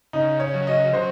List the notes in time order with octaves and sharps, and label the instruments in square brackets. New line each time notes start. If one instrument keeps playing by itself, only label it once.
[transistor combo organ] C#3 [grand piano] D#4
[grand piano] C#5
[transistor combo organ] F#3
[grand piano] D#5
[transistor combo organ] F#3 [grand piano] C5